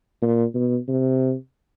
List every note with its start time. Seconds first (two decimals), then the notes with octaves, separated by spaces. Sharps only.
0.22 A#2
0.54 B2
0.88 C3